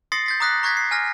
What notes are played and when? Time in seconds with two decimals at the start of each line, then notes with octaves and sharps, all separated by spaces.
0.12 C6 D#6 A6 A#6 C7 C#7
0.26 G6 A6 B6
0.40 A#5 D6 D#6 F#6 A#6 B6
0.63 A#5 C#6 F#6 G#6 A#6 B6
0.77 C7
0.91 G#5 F6 A#6